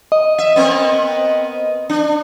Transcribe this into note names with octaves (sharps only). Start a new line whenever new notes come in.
D#5
E5
B3 C4 A#4
D4